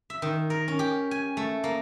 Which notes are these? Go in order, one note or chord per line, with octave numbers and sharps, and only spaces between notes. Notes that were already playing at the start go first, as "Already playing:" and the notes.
E5
D#3
A#4
C#4
G4
G#5
A3
A#3